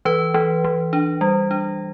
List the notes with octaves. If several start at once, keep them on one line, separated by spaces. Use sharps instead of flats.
E3 B4
E3
E3
D4
G3
D4